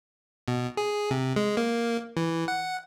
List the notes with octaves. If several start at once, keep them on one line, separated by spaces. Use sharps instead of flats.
B2
G#4
C3
G#3
A#3
E3
F#5